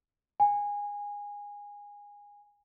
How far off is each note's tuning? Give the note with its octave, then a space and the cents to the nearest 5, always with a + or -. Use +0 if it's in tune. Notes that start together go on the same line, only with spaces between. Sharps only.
G#5 -20